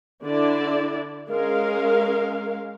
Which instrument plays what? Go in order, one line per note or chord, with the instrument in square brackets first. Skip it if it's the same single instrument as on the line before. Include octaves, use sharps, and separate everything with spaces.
[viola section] D3 D4 E4 D5
G#3 C#4 A#4 F5